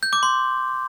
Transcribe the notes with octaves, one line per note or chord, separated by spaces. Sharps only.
G6
D6
C6